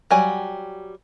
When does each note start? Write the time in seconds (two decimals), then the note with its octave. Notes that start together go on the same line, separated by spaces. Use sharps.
0.10 F#3 G3 G#5